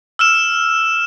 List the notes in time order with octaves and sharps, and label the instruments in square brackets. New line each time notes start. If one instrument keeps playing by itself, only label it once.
[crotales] E6 F6 E7